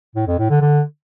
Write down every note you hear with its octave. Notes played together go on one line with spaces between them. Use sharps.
A2
F2
A2
D3
D3